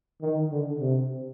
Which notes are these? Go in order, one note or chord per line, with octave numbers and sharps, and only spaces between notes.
D#3
D3
C3